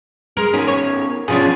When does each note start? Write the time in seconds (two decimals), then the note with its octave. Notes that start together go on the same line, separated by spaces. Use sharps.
0.37 G#3 A#4
0.54 B2 D#3 C#4 G#4
0.68 C#5
1.28 B2 F3 C#4 D4 F4 G#4